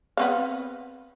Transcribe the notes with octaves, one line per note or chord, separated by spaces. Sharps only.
B3 C4 F5